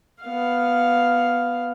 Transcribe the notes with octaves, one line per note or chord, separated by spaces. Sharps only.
B3 F5